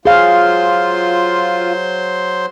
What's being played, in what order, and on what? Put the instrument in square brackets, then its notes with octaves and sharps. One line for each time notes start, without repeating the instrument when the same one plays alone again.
[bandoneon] F#3 C5 C6 [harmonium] F4 [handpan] G#4 F5